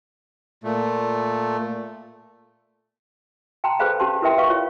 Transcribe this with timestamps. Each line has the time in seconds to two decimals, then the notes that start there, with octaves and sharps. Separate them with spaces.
0.64 A#2 A3
3.64 G5 A5 A#5 C6
3.79 G#4 A4 B4 C5 F5 B5
4.00 C#4 G4 A5 C6
4.22 E4 A#4 B4 E5 G5 C6
4.38 B4 F5 C#6
4.49 F4 C#5